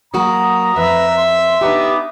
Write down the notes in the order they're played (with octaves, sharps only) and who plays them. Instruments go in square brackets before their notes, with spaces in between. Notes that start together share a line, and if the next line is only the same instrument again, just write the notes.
[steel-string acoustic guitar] F#3 A#3 F#4 [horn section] A#5 [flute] D#6
[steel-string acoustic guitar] F2 [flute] B4 [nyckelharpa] E5
[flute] C6
[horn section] B3 D#4 [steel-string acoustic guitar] D4 G4 [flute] D6